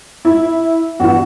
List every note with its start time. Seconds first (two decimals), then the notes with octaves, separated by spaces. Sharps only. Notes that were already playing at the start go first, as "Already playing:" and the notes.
0.25 E4
1.00 G2 E3 B3 F#4